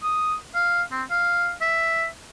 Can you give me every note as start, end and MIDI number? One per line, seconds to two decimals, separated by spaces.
0.03 0.35 87
0.55 0.82 77
0.92 1.03 60
1.11 1.53 77
1.62 2.06 76